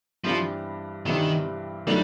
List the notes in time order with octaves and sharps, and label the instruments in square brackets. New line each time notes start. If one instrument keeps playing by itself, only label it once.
[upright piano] G2 E3 G3 C4 E4 [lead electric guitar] F3
[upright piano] G2 E3 G3 C4 E4 [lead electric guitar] D#3
[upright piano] D#3 F#3 A3 D4 [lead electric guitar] G3